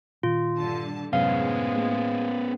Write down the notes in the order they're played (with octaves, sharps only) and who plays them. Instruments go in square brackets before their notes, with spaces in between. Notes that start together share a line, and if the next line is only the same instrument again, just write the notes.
[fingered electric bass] A#2 D#3 [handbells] F4
[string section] G2 D3 A5
[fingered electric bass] F#2 C3 F#3 [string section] A2 G#3 [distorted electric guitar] B3 C#4 [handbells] F5
[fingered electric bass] A#3